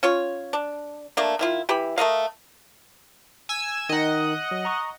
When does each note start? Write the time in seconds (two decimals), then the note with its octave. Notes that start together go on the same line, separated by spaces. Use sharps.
0.03 C#4 F4 C#5
0.53 D4
1.17 A3 A#3 D4
1.39 D#3 E4 F4
1.69 E3 G4 B5
1.98 A3 A#4 D#5 F5
3.49 G#5 E6
3.89 D#3 D#4 D#5 F#5
4.51 F#3
4.65 A#5 C#6 D#6